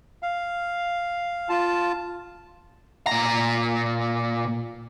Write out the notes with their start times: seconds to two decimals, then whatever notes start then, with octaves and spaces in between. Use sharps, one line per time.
0.23 F5
1.49 F4 A5
3.07 A#2 A#5